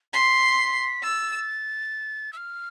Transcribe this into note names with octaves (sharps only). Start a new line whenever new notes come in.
C6 B6
E6 A6
E6
F6